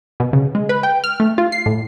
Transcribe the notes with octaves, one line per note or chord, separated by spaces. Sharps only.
B2
C#3
G#3
B4
G5
F6
A3
F4
C7
A2